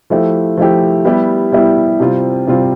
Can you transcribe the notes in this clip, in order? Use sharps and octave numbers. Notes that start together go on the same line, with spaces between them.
F3 A3 E4 G4
F3 A3 E4 G4
G3 B3 E4 G4
G3 B3 E4 G4
C3 G3 C4 F4
C3 G3 C4 F4